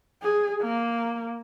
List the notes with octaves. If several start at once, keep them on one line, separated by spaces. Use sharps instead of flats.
G#4
A#3